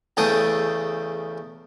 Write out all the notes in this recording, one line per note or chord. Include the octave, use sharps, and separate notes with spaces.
E2 C#3 A3 G5 A5 D#6